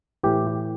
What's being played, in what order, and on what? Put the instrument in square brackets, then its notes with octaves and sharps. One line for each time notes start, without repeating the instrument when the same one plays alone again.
[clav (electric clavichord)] A2 E3 G4